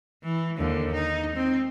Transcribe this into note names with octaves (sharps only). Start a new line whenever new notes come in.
E3
D#2 D3
D#4
C4